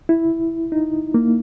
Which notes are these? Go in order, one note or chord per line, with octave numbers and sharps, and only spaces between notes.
E4
D#4
A#3